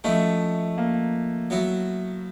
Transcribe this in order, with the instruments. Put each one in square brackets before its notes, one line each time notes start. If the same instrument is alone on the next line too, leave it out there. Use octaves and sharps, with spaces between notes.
[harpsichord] F3 G#3 C#4 E4 [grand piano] A3
[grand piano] A#3
[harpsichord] F#3 B3 E4